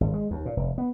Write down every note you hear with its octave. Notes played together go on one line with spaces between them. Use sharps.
G#1
G#3
D#2
A#2
F1
B3